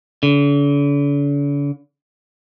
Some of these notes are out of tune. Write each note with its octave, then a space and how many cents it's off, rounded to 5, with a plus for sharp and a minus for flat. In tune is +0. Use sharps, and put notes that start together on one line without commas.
D3 -45